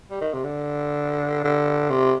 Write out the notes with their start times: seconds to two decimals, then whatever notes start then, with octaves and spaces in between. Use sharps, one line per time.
0.11 G3
0.21 D#3
0.33 C3
0.44 D3
1.44 D3
1.90 C3